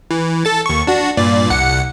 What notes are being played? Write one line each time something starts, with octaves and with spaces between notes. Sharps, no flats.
E3
A4 A6
D#2 C#6
D4 F#4
G2 A#2 D5
C2 F#5 C#7